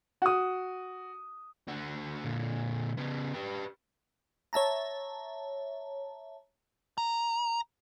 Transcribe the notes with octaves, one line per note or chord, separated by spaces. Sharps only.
F#4 D#6
D3 F#4
A#2 D3
C#3 B3
G4 B4
C#5 E5 A5 A#5
A#5